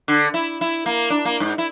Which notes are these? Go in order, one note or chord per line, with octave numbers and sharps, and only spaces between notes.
D3
E4
E4
A#3
D4
A#3
G#2
E4